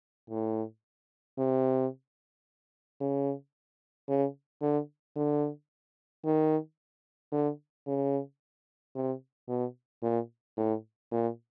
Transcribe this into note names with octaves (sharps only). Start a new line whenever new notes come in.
A2
C3
C#3
C#3
D3
D3
D#3
D3
C#3
C3
B2
A#2
A2
A#2